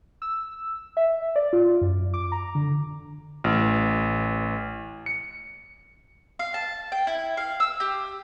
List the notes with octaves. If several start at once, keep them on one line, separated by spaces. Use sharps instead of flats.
E6
E5
D5
F4
F#2
D6
A#5
D3
A1
C#7
F5
A5
G5
E4
F5
E6
G4